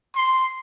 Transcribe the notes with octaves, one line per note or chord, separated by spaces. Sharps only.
C6